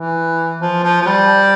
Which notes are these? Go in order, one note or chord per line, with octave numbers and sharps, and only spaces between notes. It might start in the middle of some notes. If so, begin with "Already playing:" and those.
Already playing: E3
F3
F3
F3
G3